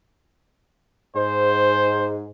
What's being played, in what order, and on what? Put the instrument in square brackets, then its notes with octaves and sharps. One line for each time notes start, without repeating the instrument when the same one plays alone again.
[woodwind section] G#2 [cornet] C5